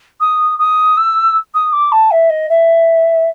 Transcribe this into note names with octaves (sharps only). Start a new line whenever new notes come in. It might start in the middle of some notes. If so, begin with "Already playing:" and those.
D#6
D#6
E6
D#6
D6
A5
E5
D#5
E5